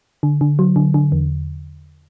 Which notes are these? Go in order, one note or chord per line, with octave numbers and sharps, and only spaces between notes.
D3
D3
F#3
D3
D3
E2